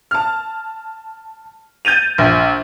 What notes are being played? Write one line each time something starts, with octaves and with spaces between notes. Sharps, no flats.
A5 F6
G6 A6 D#7 F7
A#1